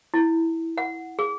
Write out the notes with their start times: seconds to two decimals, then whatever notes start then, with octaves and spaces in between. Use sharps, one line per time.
0.14 E4
0.78 F#5
1.19 G#4